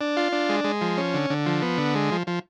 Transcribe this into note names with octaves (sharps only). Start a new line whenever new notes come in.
D4
F4
D4
G#3
G#3
F3
C#4
D3
D3
F3
B3
D3
G#3
F3
F3